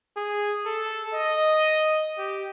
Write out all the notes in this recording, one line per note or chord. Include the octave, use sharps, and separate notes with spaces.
G#4
A4
D#5
G4